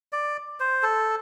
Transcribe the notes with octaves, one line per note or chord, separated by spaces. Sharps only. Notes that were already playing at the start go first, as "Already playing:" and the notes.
D5
C5
A4